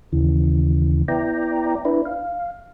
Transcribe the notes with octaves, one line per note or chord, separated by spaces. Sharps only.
D#2 C#3 E3
B3 E4 D5 G5 A#5
D4 E4 B4
F5